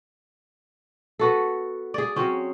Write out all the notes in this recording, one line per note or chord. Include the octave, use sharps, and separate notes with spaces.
B3 F#4 A4
G#4 D5
F#3 C4 C#4